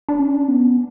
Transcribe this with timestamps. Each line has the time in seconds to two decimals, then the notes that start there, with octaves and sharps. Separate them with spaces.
0.09 D4
0.19 C#4
0.48 B3